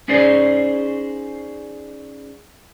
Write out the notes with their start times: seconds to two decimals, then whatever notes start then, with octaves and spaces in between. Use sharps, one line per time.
0.08 C#4 D#4 G#4 C5 D5